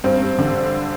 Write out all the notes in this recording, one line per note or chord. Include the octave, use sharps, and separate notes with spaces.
G2 C4
G2
D3